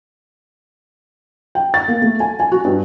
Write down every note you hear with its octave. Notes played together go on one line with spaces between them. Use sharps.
G5
A6
A#3
A3
G#5
G#5
F#4
G2